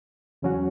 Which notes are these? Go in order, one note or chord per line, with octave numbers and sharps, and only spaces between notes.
E2 C#3 F#3 C#4 F#4